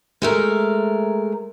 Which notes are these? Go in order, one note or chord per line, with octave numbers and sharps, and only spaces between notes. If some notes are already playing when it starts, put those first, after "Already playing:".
G#3 A3 A#4